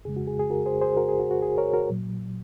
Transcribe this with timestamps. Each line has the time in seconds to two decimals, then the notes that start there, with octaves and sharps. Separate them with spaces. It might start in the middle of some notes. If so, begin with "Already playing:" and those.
0.05 F2 C#3 G#3 G#4
0.16 F#4
0.27 G#4
0.39 G#4
0.50 F#4 A#4
0.66 G#4 C5
0.81 G#4 C5
0.97 F#4 A#4
1.08 G#4
1.20 F#4
1.31 F#4
1.42 G#4
1.58 A#4 C#5
1.73 F#4 A#4
1.90 A#2 F#3